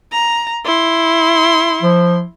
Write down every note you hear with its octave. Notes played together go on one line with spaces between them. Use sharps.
A#5
E4 C6
F3